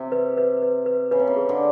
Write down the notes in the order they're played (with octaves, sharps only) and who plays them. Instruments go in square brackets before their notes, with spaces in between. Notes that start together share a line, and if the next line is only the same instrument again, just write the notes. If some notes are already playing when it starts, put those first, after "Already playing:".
Already playing: [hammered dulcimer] C3
[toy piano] B4
B4
B4
B4
[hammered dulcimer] C#3 [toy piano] B4
[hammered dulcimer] C3
C#3
[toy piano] G#4
[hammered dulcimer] D3